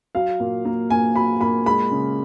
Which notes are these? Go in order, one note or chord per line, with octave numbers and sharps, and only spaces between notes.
F#3 F5
A#2
A#3
A#2 G#5
F#3 B5
A#2 B5
G#3 B5
C#3